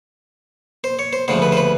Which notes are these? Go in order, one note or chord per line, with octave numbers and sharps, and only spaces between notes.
C5
C#5
C5
D2 C#3 F3 C5
B4
C5
B4